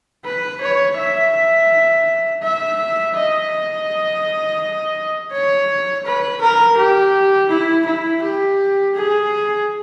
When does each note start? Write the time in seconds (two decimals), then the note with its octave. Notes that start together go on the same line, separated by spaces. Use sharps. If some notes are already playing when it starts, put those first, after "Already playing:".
0.25 B4
0.61 C#5
0.98 E5
2.43 E5
3.15 D#5
5.32 C#5
6.06 B4
6.41 A#4
6.78 G4
7.50 E4
7.86 E4
8.22 G4
8.95 G#4